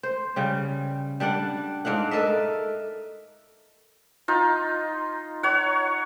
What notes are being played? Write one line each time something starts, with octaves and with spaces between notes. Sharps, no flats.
C5
C#3 G3
G3 D4 D5 F#5
G#2 D4 F5 F#5
A4 A#4 D#5 E5
D#4 F4
C#5 F#5